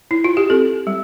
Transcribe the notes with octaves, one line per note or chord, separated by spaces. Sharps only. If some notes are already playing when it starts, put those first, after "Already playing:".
E4
F4
G4
C4 A4
G3